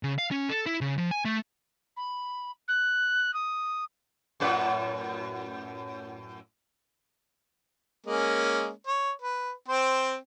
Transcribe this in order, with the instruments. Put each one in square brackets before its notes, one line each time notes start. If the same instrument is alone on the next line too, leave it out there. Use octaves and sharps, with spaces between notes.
[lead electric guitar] C#3
F5
C#4
A4
E4
C#3
F3
G#5
A3
[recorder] B5
F#6
D#6
[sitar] F#2 A2 B4
[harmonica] G#3 A#3 C#4
C#5
B4
C4 C5 G5